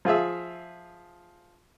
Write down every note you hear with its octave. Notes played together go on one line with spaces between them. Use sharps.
F3 F4 G#4 E5